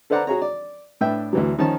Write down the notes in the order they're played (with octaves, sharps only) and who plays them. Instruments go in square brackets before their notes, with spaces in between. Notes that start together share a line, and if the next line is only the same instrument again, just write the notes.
[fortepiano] A4 B4 C5 D5 F#5 A#5
F#4 G#4 C#5 A#5
D5
A2 D4 B4 E5 G5
D2 E3 F#3
D#3 F3 C#4 A5